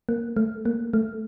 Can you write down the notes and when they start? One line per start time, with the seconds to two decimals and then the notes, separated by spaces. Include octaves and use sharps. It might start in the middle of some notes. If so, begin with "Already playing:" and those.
0.09 A#3
0.37 A3
0.65 A#3
0.93 A3